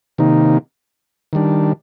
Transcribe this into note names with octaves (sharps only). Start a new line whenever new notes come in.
C3 D#3 A#3 D#4
D#3 G3 D4